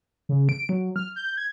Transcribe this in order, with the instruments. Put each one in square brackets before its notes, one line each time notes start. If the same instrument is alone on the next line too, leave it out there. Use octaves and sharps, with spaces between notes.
[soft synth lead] C#3
D7
F#3
F6
G6
G#6